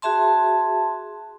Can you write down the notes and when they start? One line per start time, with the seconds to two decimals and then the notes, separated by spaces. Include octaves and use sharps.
0.02 F#4 G#4 E5 A5 C6